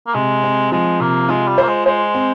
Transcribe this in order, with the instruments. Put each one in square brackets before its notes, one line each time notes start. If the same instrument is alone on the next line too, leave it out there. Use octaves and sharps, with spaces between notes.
[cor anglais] A#3
[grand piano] C3 [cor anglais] G#3
[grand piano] C4
[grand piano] F3 [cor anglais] G#3
[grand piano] C3 [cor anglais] A#3
[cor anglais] G#3 [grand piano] F4
[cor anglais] G3
[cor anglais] A#3 [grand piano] C5
[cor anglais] G#3
[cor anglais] G#3 [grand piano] C5
[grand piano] C4